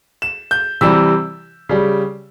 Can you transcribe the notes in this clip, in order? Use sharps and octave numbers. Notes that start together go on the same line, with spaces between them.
E7
G6
C3 E3 G3 E6
C#3 G3